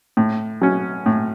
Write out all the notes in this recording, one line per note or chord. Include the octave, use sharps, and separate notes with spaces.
A2
F#3 C#4
A2